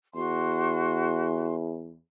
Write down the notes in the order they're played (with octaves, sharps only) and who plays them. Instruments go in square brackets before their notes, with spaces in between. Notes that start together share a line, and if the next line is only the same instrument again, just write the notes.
[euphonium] E2 [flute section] F#4 C6